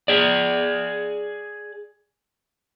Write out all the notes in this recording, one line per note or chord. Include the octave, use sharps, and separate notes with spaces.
G#4 D5